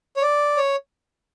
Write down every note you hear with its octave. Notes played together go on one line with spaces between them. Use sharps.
C#5
D5
C#5